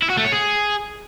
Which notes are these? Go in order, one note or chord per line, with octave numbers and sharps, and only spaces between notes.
E4
F#4
A3
C#5
G#4